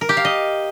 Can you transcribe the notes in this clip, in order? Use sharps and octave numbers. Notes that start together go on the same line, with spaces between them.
A#4
G4
F5
D#5